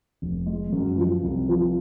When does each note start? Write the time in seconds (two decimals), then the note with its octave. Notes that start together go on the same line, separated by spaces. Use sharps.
0.22 F1
0.46 G#3
0.72 F#2
0.98 F3
1.23 C2
1.49 F3